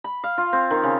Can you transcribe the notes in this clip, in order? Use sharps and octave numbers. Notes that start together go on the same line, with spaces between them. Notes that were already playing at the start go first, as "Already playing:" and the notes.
B5
F5
F4
C4
D#3
C#3